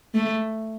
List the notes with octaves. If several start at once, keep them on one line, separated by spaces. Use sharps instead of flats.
A3